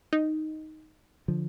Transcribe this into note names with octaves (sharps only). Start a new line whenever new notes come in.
D#4
D3 F3